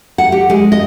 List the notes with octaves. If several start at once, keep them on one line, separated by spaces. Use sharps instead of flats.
F#5
G4
G#3
D#5